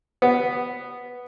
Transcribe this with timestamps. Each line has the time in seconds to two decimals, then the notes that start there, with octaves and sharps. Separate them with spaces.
0.22 B3